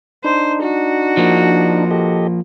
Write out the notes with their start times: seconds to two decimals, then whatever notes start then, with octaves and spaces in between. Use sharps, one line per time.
0.24 D4 D#4 C5
0.63 F#4
1.17 F3 A#3
1.91 G4 A4 D#5